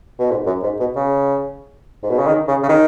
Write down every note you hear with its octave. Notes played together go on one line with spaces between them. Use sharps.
B2
G#2
F#2
G#2
B2
C#3
G#2
B2
C#3
D#3
C#3
C#3
D#3